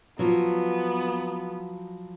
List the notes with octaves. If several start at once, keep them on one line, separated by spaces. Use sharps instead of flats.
F3 F#3 B3